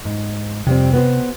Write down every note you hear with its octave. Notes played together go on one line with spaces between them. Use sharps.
G#2
F2 C3 G3 C4
B3 F#4 C5